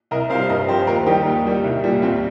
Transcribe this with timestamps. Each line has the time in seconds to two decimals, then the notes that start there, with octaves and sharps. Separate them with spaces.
0.11 C2 A#4 D#5
0.30 C3 C5 F5
0.35 G3
0.41 F5
0.49 G2 A#4 D#5
0.68 F3 G4 C5
0.87 D#2 F4 A#4
1.06 D#3 G3 D#4 G4
1.26 D#2
1.45 D#3 G3
1.64 C2
1.84 A#2 G3
2.02 D#2 C4 F4